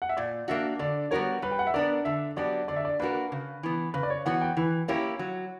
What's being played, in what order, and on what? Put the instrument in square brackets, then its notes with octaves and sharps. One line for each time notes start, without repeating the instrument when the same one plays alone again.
[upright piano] F#5
E5
[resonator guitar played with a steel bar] A#2 [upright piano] D5
[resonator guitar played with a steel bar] A#3 D4 F#4 [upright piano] E5
[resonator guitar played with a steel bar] D3 [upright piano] D5
[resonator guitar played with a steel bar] G3 B3 F#4 A#4 [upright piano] C#5
[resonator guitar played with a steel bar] G3 [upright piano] B4
[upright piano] G5
F#5
E5
[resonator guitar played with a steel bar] B3 D4 A#4 [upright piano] D5
[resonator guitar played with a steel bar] D3 [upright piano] E5
[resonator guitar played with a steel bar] F#3 B3 D4 G4 [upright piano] D5
[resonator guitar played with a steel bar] D3 [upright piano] D5
[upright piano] E5
D5
[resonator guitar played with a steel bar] A#3 D4 F#4 A#4 [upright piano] B4
[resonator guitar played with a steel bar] C#3
E3 B3
[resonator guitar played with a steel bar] C#3 [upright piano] B4
[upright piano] D5
C#5
[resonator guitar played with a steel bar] E3 B3 F#4 [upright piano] F#5
[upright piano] G5
[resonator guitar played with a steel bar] E3 [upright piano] B4
[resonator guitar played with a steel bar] A#3 C#4 E4 G4 [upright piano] C#5
[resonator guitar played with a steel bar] F#3